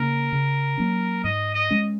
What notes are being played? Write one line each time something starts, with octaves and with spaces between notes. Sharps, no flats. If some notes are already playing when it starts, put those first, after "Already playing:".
Already playing: C#3 A#3 A#4
C#3
F#3 A#3 C#4
G#2 D#5
D#5
G#3 C#4